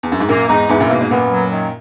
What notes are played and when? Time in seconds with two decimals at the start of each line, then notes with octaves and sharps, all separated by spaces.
0.03 E2
0.12 F#2
0.20 G#2
0.28 F#2 A#2 A#3
0.48 E2 G#2 D#4
0.69 E2 G#2 E3
0.80 F#2 A#2
0.90 G#2 B2 A#3
1.00 G#2 B2
1.11 F#2 A#2 B3
1.32 F#3
1.52 D#3